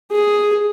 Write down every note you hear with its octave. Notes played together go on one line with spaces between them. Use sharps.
G#4